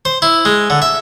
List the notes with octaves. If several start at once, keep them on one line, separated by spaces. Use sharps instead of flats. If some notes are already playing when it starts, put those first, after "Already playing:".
C5
E4
G#3
D3
E5